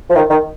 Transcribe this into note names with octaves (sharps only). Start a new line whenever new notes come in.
F3
D#3
D#3